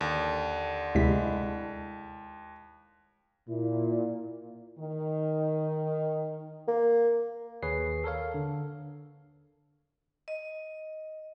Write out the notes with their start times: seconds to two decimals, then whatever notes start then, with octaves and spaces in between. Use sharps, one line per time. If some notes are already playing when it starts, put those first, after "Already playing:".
0.01 D#2 D3
0.95 D2 C3 G#3 E4 B6
3.48 A#2 E4
4.79 D#3
6.68 A#3
7.63 D#2 G#4 B4 C#5 C7
8.04 A4 A#4 C#5 F5
8.34 D3
10.28 D#5